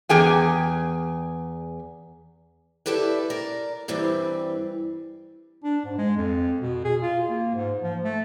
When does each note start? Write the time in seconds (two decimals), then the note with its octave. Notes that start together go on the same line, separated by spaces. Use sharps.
0.09 E2 G#4 G5 G#5
2.86 E4 G4 A4 B4 D5
3.30 A#4 D5
3.88 G2 E3 G3 C4
5.64 D4
5.85 G#2
5.98 G#3
6.17 F2
6.61 B2
6.85 G#4
7.02 F4
7.29 A#3
7.55 G#2
7.82 F3
8.04 A3